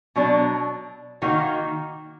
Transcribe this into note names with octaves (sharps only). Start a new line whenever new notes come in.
B2 F#3 D4
D#3 A#3 D#4 F#4